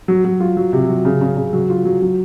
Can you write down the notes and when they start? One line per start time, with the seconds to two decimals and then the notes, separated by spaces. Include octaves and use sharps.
0.08 F#3
0.24 F#3
0.40 F4
0.57 F#3
0.73 C3
0.89 F#3
1.05 C#3
1.21 C#3
1.37 C#3
1.53 F#3
1.70 F4
1.85 F#3
2.02 F#3